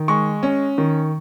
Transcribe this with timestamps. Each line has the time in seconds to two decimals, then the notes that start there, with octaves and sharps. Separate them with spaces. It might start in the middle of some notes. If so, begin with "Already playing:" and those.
Already playing: D#3
0.08 G#3 C#6
0.43 C#4
0.78 D#3